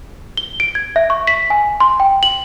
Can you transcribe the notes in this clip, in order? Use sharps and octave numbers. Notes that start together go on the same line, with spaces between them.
G7
D7
G#6
E5
C#6
B6
G#5
C6
G5
F#7